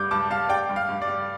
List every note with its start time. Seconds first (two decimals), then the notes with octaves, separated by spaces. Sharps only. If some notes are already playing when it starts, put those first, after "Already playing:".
Already playing: G2 G3 D6 G6
0.11 G2 A5 D6
0.30 G3 F5 A5
0.49 G3 D5 G5
0.69 G2
0.76 F5
0.89 G2
1.02 D5
1.07 G3